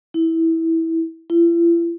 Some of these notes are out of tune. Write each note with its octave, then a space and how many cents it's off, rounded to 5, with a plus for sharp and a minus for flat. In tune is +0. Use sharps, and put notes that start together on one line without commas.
E4 -15
E4 +45